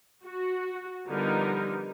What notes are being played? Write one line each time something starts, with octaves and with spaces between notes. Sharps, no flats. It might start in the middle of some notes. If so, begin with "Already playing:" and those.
F#4
D3 F3 G3 B3 D#4 A#4